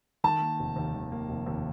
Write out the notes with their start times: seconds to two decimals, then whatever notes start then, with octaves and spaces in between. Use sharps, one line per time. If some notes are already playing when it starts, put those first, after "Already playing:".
0.24 D#3 A5
0.41 A#3
0.59 F1
0.76 D#2
0.94 D#3
1.11 A#3
1.28 F1
1.46 D#2